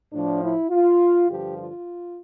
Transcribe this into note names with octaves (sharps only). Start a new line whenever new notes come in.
A2 F3 D4
E4
F4
G2 D3 F3 G4
F4